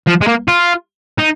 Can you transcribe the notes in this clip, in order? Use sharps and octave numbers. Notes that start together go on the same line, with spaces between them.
F3
G#3
A#3
F4
D#4